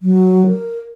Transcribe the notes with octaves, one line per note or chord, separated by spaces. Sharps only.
F#3
A#4